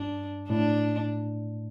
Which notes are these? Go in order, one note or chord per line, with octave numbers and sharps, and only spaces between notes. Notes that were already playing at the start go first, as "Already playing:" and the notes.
Already playing: G2 D4
A2 D4